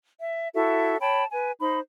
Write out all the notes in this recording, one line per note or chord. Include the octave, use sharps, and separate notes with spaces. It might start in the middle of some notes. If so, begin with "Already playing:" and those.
E5
E4 F#4 A4 E5
C#5 G5 A5 B5
B4 G#5
D#4 C5 B5